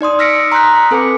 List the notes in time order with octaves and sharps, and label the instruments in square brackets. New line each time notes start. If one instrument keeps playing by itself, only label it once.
[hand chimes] D#4 D5 C6 D#6
E6 F6 A#6 B6 C#7 D7
A#5 C6 D#6 F#6 G6 B6
B6
C4 A4 B4 G#5 D6 C#7